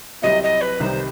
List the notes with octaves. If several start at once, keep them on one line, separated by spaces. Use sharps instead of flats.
C2 C3 F#3 C4 E4 D#5
D#5
B4
C2 C3 D#3 G3 D#4 C5